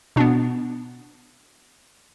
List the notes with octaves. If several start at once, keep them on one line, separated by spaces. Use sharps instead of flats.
B2 B3 D4